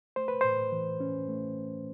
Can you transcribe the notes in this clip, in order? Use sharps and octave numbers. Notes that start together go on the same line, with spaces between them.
A3 C5
B4
A2 C5
E3
C#4
A3